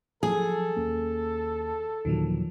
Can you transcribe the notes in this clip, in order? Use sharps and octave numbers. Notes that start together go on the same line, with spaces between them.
F3 F#3 G#4 A4
D#2 A#3 C#4
D#2 A#2 D3 D#3 F3 F#3